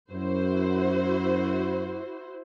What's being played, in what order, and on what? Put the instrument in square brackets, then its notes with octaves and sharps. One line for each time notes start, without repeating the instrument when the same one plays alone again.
[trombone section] F#2 [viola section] E4 F#4 C5